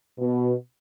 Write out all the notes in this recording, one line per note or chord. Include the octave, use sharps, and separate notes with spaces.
B2